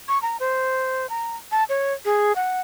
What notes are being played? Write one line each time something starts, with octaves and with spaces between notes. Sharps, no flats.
C#6
A#5
C5
A#5
A5
C#5
G#4
F#5